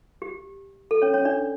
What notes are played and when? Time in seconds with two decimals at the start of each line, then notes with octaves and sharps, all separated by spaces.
0.22 G4
0.91 A4
1.02 C#4 C#5
1.14 C#4 C#5
1.25 D4 D5